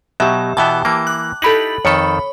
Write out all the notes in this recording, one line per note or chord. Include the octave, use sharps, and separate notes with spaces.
B2 F#3 G4 E5
B2 E3 B3 E5 G5 A5
E3 A#3 D6
F#6
D#4 E4 G4 A4 B5 F#7
F2 D#3 A4 C#5 B5